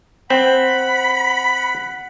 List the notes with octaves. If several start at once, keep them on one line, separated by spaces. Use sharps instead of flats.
C4 F#5 B5